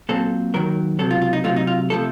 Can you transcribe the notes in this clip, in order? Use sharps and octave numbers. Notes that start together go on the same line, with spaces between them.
A#2 F#3 C4 A4
D#2 D#3 F#3 A#4
C#2 C3 F#3 A4
F4
F4
D#4
C3 F#3 A3 F4
D#4
F4
C3 F3 A3 A4